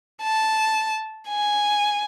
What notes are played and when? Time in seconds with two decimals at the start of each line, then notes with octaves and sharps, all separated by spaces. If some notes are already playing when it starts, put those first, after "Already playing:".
0.23 A5
1.28 G#5